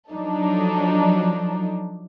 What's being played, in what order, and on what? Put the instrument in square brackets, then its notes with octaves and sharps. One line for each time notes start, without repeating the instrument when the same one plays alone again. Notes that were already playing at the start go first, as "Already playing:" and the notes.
[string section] F3 F#3 D4 D#4 A4